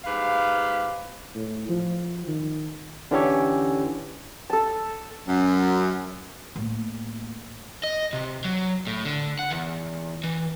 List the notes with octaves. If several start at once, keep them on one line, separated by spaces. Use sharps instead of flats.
G#2 G4 B4 F5
A2
F3
D#3
D3 E3 C#4 G4 A4 C#5
A4 A5
F#2
A2 A#3
D#5
C3
F#3
A2
D3
F#5
E2
E3